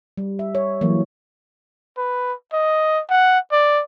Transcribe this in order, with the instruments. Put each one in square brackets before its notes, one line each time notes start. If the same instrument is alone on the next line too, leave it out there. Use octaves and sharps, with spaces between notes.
[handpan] G3
E5
C#5
E3 F#3 A#3
[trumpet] B4
D#5
F#5
D5